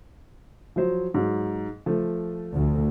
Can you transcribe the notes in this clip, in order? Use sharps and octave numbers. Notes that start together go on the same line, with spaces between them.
F3 F#3 C5
G#2 F#3
F3 A3
D2